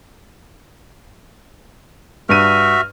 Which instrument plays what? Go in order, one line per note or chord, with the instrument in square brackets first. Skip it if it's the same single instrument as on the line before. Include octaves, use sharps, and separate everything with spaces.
[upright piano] G2 D#7 [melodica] F#4 E5 [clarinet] F6